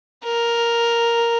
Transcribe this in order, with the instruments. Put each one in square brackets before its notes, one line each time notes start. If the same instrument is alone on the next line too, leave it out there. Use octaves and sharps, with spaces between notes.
[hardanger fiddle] A#4